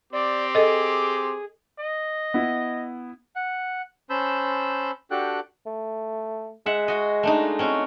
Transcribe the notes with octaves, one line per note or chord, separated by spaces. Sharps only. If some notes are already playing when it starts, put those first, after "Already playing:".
C4 G4 D5 D6
G#4 A4 D#5
D#5
B3 E4
F#5
C#4 C5 A5 B5 E6 G6
D4 F#4 G4 A4 G5 F#6
A3
G#3 E5 F#5
F#4 D#5
A3 D4 D#4
C4 C#4 F#4